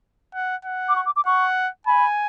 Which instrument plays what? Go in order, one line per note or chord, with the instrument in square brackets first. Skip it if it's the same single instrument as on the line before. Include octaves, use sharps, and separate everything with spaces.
[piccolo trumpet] F#5
F#5
[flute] D6
C#6
D6
D6
[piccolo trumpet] F#5 [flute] C#6
[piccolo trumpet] G#5 [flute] B5